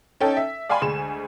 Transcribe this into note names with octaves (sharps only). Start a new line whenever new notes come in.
C#4 D#4 A4 G5
E5
D5 F5 G5 G#5 B5 C6
D2 G#3 G#5 E7